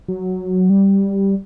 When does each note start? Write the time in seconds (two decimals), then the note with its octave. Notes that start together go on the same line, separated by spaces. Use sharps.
0.08 F#3
0.70 G3